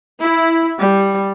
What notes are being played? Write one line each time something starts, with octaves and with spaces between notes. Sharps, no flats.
E4
G3